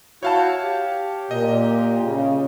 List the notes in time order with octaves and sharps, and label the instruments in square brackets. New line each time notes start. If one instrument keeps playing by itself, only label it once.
[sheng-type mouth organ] E4 F#4 G6 [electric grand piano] C#5 F5 A5
[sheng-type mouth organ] G4
[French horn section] A#2 [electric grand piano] D#5
[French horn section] C#3